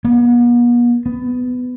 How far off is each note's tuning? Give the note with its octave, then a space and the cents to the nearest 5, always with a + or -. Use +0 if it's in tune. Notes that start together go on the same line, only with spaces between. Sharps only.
B3 -45
B3 +15